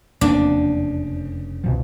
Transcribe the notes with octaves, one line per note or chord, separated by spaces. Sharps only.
F1 E2 C#3 A#3 C4 D4
C2 B2 F3